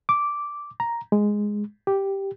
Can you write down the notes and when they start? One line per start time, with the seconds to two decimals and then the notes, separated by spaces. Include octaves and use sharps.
0.09 D6
0.80 A#5
1.12 G#3
1.87 G4